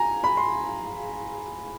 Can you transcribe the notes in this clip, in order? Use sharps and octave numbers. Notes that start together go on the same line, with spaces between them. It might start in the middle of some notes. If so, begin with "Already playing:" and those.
Already playing: G#5 A#5
B5
C6